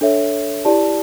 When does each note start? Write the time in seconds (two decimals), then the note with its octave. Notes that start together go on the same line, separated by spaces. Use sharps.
0.01 D4 A4 C#5 E5
0.65 E4 G4 D5 A5